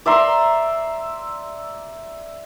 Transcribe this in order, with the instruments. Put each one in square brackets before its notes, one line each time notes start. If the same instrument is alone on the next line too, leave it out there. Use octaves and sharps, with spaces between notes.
[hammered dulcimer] D5 E5 A#5 C6